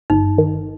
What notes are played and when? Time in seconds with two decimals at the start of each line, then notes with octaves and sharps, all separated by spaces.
0.10 G1 D#4
0.38 D#3